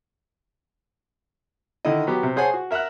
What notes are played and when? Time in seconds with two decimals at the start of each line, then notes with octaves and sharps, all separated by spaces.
1.85 D3 D#3 E4 D#5
2.07 F#3 B3 G4
2.23 C3
2.36 G#4 C5 C#5 F#5 G#5 A5
2.54 F#4
2.71 A#4 E5 F#5 A#5 F#6